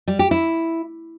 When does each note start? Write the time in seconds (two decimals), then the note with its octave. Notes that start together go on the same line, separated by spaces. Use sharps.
0.08 G3
0.19 G4
0.31 E4